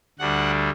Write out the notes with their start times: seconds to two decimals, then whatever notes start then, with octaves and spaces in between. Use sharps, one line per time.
0.19 D2 D3 G3 F#5